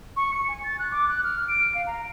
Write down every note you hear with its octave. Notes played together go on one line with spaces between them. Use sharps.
C#6
C#7
G#5
A6
F#6
D6
F#6
F6
D7
F5
A#5